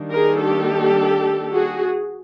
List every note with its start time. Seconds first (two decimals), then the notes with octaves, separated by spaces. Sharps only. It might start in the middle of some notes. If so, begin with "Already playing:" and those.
Already playing: D#3 G3 A#3 D4
0.12 G#4 A#4
0.40 G4 A4
1.52 F#4 G#4